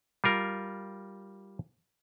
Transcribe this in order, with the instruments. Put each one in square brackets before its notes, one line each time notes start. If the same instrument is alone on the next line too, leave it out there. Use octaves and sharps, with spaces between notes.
[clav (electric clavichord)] G3 F4 A#4